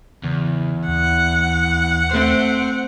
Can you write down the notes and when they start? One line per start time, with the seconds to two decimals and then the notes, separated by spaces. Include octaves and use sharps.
0.23 E2 C#3
0.88 D#2 F#5
2.11 A3 C4 C5